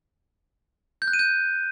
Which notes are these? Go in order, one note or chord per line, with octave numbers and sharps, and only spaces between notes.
G6
F#6
D#7
G6